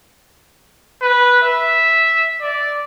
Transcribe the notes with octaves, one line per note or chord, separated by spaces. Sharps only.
B4
E5
D5